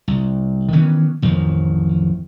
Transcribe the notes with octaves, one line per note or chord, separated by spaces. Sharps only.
C2
D#3 E3 B3 C#4
A1 F2 D#3 F3